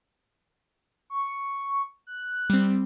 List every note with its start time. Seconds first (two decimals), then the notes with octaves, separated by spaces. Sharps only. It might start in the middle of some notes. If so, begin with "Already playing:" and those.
1.10 C#6
2.07 F#6
2.50 G3 C4